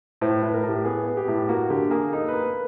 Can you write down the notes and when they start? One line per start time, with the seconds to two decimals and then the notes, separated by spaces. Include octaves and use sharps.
0.21 A2 C5
0.37 B4
0.43 A2
0.54 A#4
0.64 A2
0.69 G4
0.85 B3 G#4
1.07 B3
1.17 G4
1.28 A2
1.49 A#3 F#4
1.70 D3 G4
1.91 A#3 G#4
2.12 D#4 A4
2.28 B4
2.33 A#3
2.44 B4